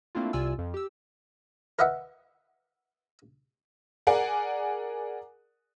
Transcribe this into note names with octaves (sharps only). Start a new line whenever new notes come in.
A3 A#3 C4 D4 E4 F4
C2 C3 F4 D5 G#5 E6
F2
G4 E6
A#4 B4 D#5 E5 F#5
G#4 A#4 D5 F#5 G#5